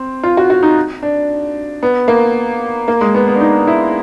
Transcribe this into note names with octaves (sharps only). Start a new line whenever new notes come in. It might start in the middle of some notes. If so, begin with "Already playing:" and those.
Already playing: C4
F4
F#4
F#4
D#4
D4
B3
A#3
A#3
G#3
B3
B3
D4
D#4
E4